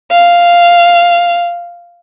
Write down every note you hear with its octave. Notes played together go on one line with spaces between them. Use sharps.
F5